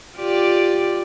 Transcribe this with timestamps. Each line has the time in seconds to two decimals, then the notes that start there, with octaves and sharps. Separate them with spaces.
0.17 F4 G4 D5